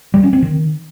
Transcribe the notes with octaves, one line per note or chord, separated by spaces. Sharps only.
G3
C#4
C4
D#3